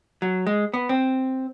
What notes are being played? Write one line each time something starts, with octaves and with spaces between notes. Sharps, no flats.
F#3
G#3
B3
C4